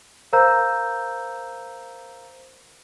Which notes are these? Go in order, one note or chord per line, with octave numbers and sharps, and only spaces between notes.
A#4 C5 F5 A#5 E6 G6